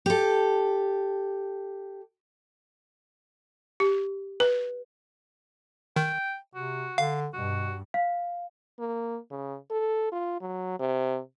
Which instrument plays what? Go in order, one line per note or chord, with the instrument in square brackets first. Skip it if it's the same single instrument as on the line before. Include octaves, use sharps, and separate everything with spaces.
[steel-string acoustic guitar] G4 A4
[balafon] G4
B4
[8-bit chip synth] D#3 [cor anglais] G5
[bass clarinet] C3 [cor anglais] F#4
[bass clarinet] D3 [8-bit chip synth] F5
[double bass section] G2 [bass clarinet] B2 [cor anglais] F#4
[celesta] F5
[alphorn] A#3
C#3
A4
F4
F#3
C3